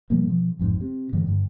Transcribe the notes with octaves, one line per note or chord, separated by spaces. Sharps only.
B2 F3 G3 A#3
B2 F3
A1 F2 G#2
C3
G2 D3 E3 G#3
G2 D3